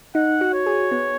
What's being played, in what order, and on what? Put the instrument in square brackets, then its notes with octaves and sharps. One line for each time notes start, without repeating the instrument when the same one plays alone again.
[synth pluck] D#4 [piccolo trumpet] F#5
[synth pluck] F#4
[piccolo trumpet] C#5
[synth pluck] G#4
B3